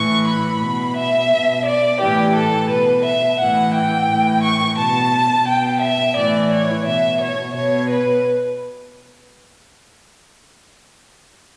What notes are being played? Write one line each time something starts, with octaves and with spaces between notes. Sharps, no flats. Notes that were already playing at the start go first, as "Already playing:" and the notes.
Already playing: A2 E3 C#6
B5
B2
E5
B2
D5
A2 E3 G4
A4
B2 B4
E5
A2 E3 F#5
G5
A2 E3
C#6
B2 A5
B2 G5
E5
A2 E3 D5
C#5
B2 E5
C#5
B2 C#5
B4